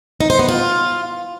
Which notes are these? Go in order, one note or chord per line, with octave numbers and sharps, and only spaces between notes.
D#4
C5
B3
F4